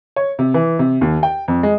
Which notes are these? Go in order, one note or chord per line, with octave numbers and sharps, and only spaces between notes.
C#5
C3
E3
C3
D#2
G5
F2
G#3